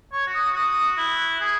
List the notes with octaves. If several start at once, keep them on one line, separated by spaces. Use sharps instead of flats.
C#5 C#6
F#4
D#6
F#4
F#4 D#6
E4 F#6
G#4